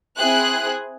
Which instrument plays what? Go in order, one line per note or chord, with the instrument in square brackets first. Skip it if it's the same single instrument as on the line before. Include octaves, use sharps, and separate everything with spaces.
[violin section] C4 E4 G#4 F#6